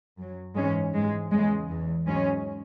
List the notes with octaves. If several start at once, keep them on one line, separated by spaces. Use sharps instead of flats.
F#2 F#3
G#2 E3 G#3 C#4
G#2 E3 G#3
E2 C#3 E3 G#3
E2 E3
G#2 F#3 G#3 C#4